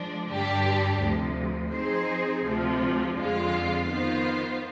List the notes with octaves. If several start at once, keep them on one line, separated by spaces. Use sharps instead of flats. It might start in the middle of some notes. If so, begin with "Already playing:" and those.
Already playing: F3 G#3 D4
G2 D3 G3 D4 G4
D2 C3 F3
F3 C4 D#4 G#4 C5
D2 C3 F3 C4
F2 D3 G#3 C4 F4
D#3 B3 F4 C5